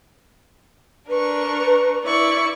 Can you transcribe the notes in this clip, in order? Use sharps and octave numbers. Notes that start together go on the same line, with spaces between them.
D4 A#4 B4 C#6
E4 D5 C#6